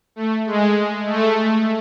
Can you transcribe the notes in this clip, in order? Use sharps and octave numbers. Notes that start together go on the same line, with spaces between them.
A3
G#3
A3